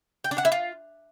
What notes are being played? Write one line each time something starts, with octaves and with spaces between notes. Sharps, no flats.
G5
D4
F#5
E4
F4